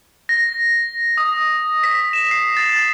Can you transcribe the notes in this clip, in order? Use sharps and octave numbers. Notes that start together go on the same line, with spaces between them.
A#6
D#6
B6
E7
C7
A6